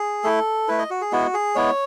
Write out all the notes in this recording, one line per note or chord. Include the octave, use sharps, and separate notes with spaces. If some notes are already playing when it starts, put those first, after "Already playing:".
Already playing: G#4
A3 E4 A4
A3 E4 B4
D#5
F#4
G#4
G#3 B3 E4 F#4
G#4
G#3 B3 E4 C#5